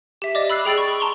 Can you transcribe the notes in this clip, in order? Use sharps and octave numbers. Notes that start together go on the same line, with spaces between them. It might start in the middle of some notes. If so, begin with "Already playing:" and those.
G4 E5
D5 D#5 D6
B5 E6 F#6 C7
G#4 G5 B5 A6 D7
C#6
A5 A#5 C6 C#6